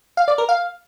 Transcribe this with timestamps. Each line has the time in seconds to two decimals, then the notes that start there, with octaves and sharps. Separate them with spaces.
0.17 F5
0.28 D5
0.38 A#4
0.49 F5